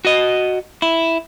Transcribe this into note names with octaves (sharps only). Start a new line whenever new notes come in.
F#4 D#5
E4